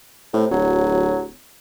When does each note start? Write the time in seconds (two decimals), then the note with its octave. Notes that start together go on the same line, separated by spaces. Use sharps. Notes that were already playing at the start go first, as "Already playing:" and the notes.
0.33 A2 C3
0.51 D1 F#3